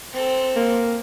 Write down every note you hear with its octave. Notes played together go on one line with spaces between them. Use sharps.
C4 A4
A#3